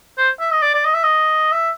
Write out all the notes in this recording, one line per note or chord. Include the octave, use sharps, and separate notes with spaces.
C5
E5
D#5
D5
D5
D#5
E5
D#5
E5